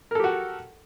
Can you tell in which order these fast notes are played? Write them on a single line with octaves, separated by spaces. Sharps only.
A#4 A4 G4 F#4